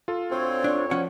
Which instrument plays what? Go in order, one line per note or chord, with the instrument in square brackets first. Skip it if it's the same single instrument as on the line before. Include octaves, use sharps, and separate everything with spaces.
[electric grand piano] F4 A4
[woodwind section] D2 C#5 [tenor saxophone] C4
[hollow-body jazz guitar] D4
[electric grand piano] F3 [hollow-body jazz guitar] C#4 F#5